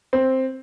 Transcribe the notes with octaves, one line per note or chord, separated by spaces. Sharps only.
C4